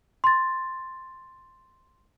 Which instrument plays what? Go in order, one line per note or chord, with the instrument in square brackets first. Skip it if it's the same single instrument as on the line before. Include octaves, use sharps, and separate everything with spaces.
[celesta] C6 A6